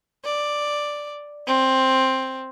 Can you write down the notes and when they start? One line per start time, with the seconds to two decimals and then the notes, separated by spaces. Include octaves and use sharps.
0.25 D5
1.47 C4